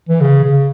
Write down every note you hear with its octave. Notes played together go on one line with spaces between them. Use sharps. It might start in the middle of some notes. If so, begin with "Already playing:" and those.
E3
C#3
C#3